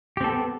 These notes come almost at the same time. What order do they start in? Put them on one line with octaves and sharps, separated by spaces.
G4 C4 A4 B3